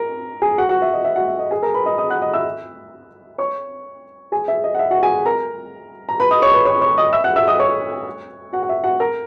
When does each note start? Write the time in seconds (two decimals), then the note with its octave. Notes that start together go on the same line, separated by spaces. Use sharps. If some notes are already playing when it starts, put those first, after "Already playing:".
Already playing: A#4 A#5
0.42 G#4 G#5
0.58 F#4 F#5
0.69 F#4 F#5
0.82 E5
0.93 D#5
1.04 E5
1.16 F#4 F#5
1.28 E5
1.39 D#5
1.51 G#4 G#5
1.63 A#4 A#5
1.74 B4 B5
1.86 D#5 D#6
1.98 D#5 D#6
2.10 F#5 F#6
2.21 D#5 D#6
2.34 E5 E6
3.38 C#5 C#6
4.32 G#4 G#5
4.48 E5
4.64 D#5
4.75 F#5
4.79 E5
4.91 F#4 F#5
5.02 G#4 G#5
5.26 A#4 A#5
6.09 A#5
6.20 B4 B5
6.31 D#5 D#6
6.42 C#5 C#6
6.54 B4 B5
6.65 C#5 C#6
6.81 C#5 C#6
6.98 D#5 D#6
7.13 E5 E6
7.24 F#5 F#6
7.36 E5 E6
7.47 D#5 D#6
7.59 C#5 C#6
8.53 F#4 F#5
8.63 F#5
8.69 E5
8.84 F#4 F#5
9.00 A#4 A#5